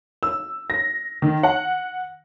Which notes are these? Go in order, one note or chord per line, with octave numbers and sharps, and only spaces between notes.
E6
A#6
D#3
F#5